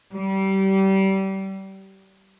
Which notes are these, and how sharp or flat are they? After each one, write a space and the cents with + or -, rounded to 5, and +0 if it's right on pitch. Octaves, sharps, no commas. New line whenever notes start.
G3 -25